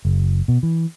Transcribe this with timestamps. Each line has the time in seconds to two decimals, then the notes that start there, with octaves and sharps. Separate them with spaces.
0.05 F#1
0.48 B2
0.63 E3